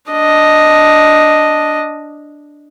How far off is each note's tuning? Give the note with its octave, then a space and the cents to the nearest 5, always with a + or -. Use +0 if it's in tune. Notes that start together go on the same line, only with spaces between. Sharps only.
D4 +0 D#5 +0